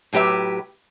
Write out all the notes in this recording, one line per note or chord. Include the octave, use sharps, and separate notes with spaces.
A2 F#3 G4 B4 E5